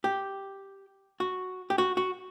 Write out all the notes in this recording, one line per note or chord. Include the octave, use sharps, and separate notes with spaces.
G4
F#4
G4
F#4
F#4